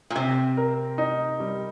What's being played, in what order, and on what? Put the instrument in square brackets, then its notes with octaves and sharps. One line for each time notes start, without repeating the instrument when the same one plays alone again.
[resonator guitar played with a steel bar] A#2
[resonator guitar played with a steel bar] C3 [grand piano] C4
[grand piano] A#4
D#4
G3